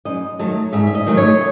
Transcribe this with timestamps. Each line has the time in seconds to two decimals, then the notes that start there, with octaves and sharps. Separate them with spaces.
0.05 F#2 D#5
0.39 D#3 F#3 A3
0.73 G#2 E5
0.87 E5
0.95 D#5
1.06 D#3 F#3 A3
1.17 C#5